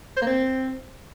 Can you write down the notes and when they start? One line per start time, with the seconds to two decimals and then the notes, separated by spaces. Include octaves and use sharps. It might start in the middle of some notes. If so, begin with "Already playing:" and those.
0.17 C5
0.22 A#3
0.27 C4